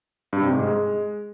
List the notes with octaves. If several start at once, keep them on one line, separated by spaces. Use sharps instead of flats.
G2
C3
G#2
G#3